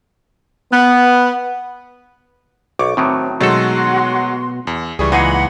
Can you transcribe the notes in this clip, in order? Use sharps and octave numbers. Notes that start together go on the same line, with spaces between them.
B3
B1 C#6 D6
A2 D#3 F#3 C4
B2 D#3 F#3 G#3 A3 F#4 A4 C6
E2
C#2 E3 G3 G#4 C#6
A#2 E3 D#4 G#4 F#5 B5